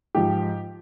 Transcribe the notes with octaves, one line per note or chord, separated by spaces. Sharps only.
G#2 F3 G4